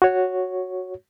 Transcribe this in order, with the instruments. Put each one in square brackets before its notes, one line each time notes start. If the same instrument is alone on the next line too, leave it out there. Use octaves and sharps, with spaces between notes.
[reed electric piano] F#4 C#5